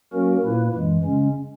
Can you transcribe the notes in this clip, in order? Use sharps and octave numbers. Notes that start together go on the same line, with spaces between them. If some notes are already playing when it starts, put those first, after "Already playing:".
F#3 A#3 C#4 F#4 A#4
A#2 A#3 E4 B4
F#2 E3 G#3
C#3 G#3 C#4